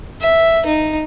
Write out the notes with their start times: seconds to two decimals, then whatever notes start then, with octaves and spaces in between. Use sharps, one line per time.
0.20 E5
0.66 D#4